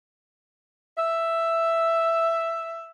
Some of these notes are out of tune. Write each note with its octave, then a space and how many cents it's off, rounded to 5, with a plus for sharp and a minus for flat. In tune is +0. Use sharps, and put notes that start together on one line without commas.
E5 +5